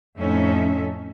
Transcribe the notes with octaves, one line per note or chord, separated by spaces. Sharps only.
F2 A2 C#4 D#4 A4 E5